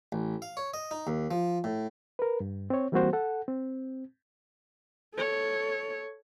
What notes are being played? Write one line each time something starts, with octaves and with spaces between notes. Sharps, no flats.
A1
F5
C#5
D#5
D#4
D#2
F3
A2
A#4 B4
G2
C4 C#5
E3 G3 A#3 C4 F#4 C5
A4 F#5
C4
A4 C#5